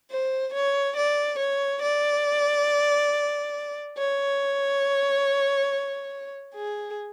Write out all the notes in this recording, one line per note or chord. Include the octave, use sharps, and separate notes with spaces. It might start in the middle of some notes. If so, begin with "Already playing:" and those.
C5
C#5
D5
C#5
D5
C#5
G#4